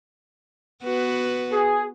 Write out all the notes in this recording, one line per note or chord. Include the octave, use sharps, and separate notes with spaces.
B3 F#4 B4
G#4